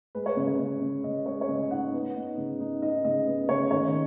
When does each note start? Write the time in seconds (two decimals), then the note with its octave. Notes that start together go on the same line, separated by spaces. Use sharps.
0.15 G#3 B4
0.26 C#5
0.37 C#3
0.48 C#5
0.59 C#3
0.81 C#3
1.04 C#3 D#5
1.26 G#3 C#5
1.41 C#5
1.49 C#3 D#5
1.71 D#4 F#5
1.93 B3
2.15 D#4
2.38 C#3
2.60 D#4
2.82 D#4 D#5
3.04 C#3 D#5
3.27 B3
3.49 C#3 C#5
3.71 D#3 C#5